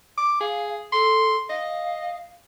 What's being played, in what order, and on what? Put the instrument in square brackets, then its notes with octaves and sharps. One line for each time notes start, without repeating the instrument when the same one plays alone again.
[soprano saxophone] D6
[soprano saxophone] G#4 [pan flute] F5
[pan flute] A4 [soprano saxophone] C6
[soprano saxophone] D#5 [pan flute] F5